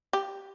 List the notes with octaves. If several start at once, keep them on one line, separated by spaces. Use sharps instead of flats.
G4